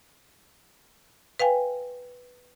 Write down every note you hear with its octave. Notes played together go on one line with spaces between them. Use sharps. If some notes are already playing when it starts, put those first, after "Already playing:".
B4 F5 G5 G#5